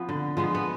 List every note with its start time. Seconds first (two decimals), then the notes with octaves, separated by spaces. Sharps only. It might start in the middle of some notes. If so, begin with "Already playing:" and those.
Already playing: F3 B3 C4
0.09 D3
0.37 F3 G#3 B3
0.55 B3